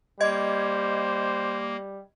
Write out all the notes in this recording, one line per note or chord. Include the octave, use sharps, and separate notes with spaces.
G3 A#3 C5 D#5 G#6